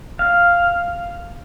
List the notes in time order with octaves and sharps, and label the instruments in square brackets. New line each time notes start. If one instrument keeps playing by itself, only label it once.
[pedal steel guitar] F5